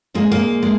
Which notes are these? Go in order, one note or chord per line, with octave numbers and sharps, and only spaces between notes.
A#2 G#3 A#3
A#3
G#3